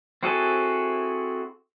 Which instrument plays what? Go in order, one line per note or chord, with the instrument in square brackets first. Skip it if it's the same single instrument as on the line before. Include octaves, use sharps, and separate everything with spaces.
[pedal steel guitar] C4 E4 F#4 G#4 A4